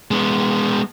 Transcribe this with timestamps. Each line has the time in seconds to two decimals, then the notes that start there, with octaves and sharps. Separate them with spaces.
0.11 G#3 B3